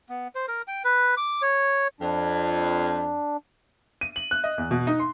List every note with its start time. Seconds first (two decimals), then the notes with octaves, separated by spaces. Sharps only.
0.09 B3
0.35 C5
0.48 A#4
0.68 G5
0.84 B4
1.17 D6
1.42 C#5
2.00 F2 D4
4.01 D#7
4.16 F#7
4.31 F#6
4.44 D#5
4.58 E2
4.71 B2
4.87 D#4
5.00 C6